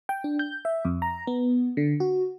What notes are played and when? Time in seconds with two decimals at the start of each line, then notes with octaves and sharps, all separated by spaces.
0.09 G5
0.24 D4
0.39 G6
0.65 E5
0.85 F2
1.02 A#5
1.27 B3
1.77 D3
2.00 F#4